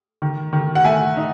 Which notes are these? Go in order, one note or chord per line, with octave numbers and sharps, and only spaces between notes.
D#3
D#3
F#5
A3 E5 G#5
D#4